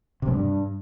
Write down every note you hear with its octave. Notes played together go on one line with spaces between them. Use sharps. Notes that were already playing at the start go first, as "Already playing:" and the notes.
C3
G3
G2